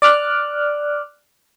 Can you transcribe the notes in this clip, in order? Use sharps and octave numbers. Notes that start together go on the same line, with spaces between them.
D5 D6 F6 F#6